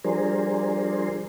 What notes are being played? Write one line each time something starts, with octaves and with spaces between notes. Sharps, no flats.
F3 G3 D4 G#4 A#4 C5